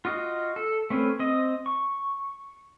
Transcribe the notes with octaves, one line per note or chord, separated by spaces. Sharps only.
F4 F#4 D#5
A4
A3 C4 C#4 B4
C4 D#5
C#6